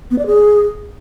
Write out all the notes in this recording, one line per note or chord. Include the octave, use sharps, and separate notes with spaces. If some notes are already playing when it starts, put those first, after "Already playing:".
B3
D5
G#4